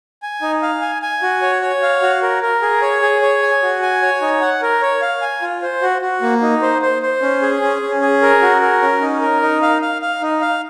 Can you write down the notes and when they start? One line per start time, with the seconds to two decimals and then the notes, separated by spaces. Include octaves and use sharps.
0.23 G#5
0.42 D#4
0.62 F5
0.82 G#5
1.02 G#5
1.22 F#4
1.42 C#5
1.62 C#5
1.82 F5
2.02 F#4
2.22 A#4
2.42 A#4
2.62 G#4
2.82 C#5
3.02 G#4
3.22 C#5
3.42 G#5
3.62 F#4
3.82 G#5
4.02 C#5
4.21 D#4
4.41 F#5
4.62 A#4
4.82 C#5
5.02 F5
5.21 G#5
5.42 F4
5.62 C5
5.82 F#4
6.02 F#4
6.22 A#3
6.42 D#4
6.62 C5
6.82 C5
7.02 C5
7.22 C#4
7.42 G#4
7.62 C#4
7.82 C#4
8.02 G#4
8.22 A#4
8.42 F#4
8.62 A#4
8.82 C#4
9.01 D#4
9.21 A#4
9.42 D#4
9.62 F5
9.82 F5
10.02 F5
10.22 D#4
10.41 F5